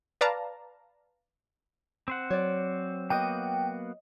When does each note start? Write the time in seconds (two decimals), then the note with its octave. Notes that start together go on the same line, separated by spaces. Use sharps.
0.21 B4 D5 F5 A5 A#5
2.08 C4 C5 F#5
2.30 F#3 C#5 D5
3.10 A#3 B3 F#4 D#5 G5 D#7